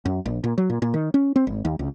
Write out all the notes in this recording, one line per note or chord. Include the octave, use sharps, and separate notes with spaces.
F#2
A#1
A#2
F#3
A#2
A#2
D#3
C#4
C4
G#1
D#2
C#2